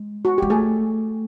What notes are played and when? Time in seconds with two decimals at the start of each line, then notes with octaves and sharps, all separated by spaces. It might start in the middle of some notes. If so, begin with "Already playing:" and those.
Already playing: G#3
0.25 F#4
0.38 G#3 G4
0.50 A3 G#4